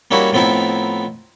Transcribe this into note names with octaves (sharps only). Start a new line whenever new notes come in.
G3 A#3 C#4 D#4 E4 F#4
A2 F3 B3 C4 D#4 E4